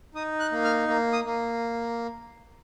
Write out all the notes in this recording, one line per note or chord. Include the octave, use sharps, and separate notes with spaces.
D#4 D#6
F#6
A#3
F6
A#3
D#6
A#3